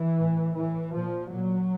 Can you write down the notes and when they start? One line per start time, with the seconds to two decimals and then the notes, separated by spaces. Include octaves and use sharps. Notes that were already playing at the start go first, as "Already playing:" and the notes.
Already playing: E3
0.18 A2
0.56 A2 E3
0.94 A#2 F3
1.32 A#2 F#3